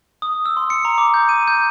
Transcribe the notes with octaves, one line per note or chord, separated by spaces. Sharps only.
D#6
E6
C6
C#7
A#5
D6
G6
D#7
G6